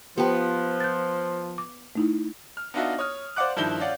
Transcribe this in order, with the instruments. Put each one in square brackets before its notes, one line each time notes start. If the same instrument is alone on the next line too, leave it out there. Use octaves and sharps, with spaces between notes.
[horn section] F3 [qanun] B3 B4 [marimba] G4 G5
[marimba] G6 A6
D6
A3 D#4 E4
[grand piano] F6
B3 D4 D#4 F4 F#4 E5
C#5 D#6 F6
C5 D5 F5 F#5 D6 F#6
G2 D#3 F3 E4 G6 G7
C#4 F4 D5 F#5